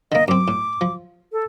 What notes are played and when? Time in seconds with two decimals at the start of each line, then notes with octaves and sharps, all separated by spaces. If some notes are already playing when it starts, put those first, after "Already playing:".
0.12 D3 A#3 D#5
0.28 F#2 C4 D6
0.48 A2
0.81 F3
1.32 A4